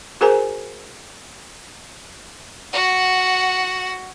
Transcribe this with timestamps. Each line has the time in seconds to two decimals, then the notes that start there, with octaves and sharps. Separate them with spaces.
0.21 F#4 G#4 A#4 C5 G#5 A#5
2.73 F#4 F#5